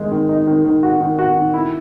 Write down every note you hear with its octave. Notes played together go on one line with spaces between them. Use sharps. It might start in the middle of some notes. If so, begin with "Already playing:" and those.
Already playing: D#3 G#3 D#4
D#3
D#4
D#3
D#3
F#4
D#3
F#4
D#3
E4